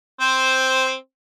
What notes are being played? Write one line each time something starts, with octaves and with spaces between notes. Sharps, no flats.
C4 C5